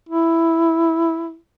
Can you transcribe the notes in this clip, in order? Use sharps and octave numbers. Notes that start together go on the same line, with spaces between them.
E4